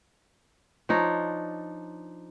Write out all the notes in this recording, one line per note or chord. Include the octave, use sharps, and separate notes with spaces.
F3 D4 D#4 C#5